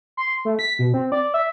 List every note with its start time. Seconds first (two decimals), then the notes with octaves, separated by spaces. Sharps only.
0.17 C6
0.45 A3
0.59 B6
0.79 B2
0.94 C4
1.12 D5
1.34 E5